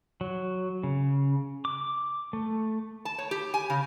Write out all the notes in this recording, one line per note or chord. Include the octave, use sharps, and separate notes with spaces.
F#3
C#3
D6
A3
A5
C#5
G4
G#5
C#3